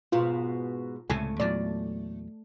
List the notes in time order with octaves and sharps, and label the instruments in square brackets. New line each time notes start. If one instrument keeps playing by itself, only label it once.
[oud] G#2 B2 [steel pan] F4
[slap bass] C#2 A2 C3 [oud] A3 [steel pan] G#5
[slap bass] E2 A#2 F#3 [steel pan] D5